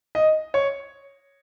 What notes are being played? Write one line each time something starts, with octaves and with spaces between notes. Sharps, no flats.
D#5
C#5